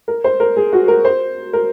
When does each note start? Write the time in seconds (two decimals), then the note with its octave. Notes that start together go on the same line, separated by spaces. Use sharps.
0.08 A#4
0.24 C5
0.40 A#4
0.57 G#4
0.73 F#4
0.88 A#4
1.05 C5
1.53 A#4